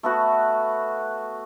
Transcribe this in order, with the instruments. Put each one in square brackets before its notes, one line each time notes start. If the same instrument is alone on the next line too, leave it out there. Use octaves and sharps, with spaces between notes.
[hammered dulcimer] A3 B3 F#4